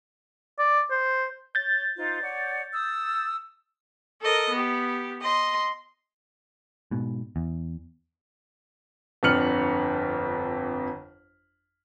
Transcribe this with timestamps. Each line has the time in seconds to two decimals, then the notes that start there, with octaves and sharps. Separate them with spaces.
0.59 D5
0.91 C5
1.55 C#5 G6 A6
1.97 D#4 F4 C5
2.22 C#5 D5 F#5
2.72 D#6 E6
4.21 A4 A#4 D#5
4.50 B3 G4
5.23 D#5 C6
6.91 G#2 B2
7.36 E2
9.23 G1 F2 D4 F6 C#7 F#7